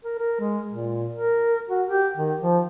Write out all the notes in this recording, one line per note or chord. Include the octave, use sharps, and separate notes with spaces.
A#4
A#4
G#3
A#2
A#4
F#4
G4
D#3
F3